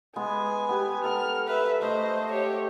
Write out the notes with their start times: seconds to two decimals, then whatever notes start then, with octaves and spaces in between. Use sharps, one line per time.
0.16 G#3 B3 G#5 B5
0.69 B3 G4 B4
1.04 A4 A#4 F#5 F6
1.47 B4 E5
1.81 A3 C5 D#5 E5
2.32 G4 C#5